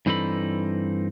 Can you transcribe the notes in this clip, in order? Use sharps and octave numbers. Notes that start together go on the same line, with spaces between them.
G2 E3 C4 D#4 A4 B5